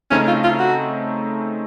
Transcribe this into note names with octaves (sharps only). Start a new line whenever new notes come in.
C#3 A3 C4 C#4 D#4
F4
F4
F#4